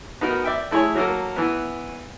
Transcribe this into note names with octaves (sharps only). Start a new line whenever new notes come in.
B3 D#4 F#4 A#4
D5 E5 G5
A3 E4 G#4 C#5
F#3 A#3 A4 A#4
E3 B3